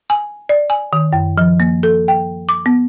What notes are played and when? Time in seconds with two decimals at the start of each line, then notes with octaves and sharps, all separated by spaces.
0.10 G#5
0.49 D5
0.70 G#5
0.93 D#3
1.13 F#2
1.38 F3
1.60 A#3
1.83 A4
2.08 G5
2.49 D6
2.66 B3